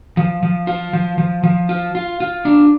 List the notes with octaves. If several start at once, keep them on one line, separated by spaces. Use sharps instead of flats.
F3
F3
F4
F3
F3
F3
F4
F4
F4
D4